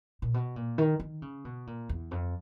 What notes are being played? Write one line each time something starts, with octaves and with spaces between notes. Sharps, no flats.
A#2
B2
A#2
D#3
D#3
C#3
B2
A#2
E2
F2